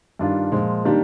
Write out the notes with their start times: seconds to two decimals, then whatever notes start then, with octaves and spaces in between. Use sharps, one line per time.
0.19 G2 D#3 G3 D4 F4
0.52 A#2 F3 G#3
0.85 D#3 G3 A#3 D4 G4